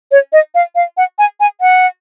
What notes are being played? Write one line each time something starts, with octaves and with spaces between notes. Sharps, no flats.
C#5
D#5
F5
F5
F#5
G#5
G#5
F#5